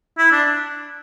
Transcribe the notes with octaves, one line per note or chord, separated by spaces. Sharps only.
E4
D4